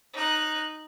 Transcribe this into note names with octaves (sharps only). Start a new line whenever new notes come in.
D#4 F#6